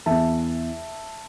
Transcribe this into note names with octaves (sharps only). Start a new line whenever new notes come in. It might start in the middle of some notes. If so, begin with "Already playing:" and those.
E2 E3 E5 A5